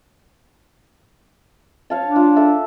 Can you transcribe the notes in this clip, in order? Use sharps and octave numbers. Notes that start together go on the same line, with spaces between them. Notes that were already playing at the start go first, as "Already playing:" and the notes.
C#5 F5 A5
D4
F4
A4 E5